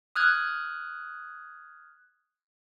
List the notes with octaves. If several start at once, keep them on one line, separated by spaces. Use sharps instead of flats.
D#6 F6 F#6 G#6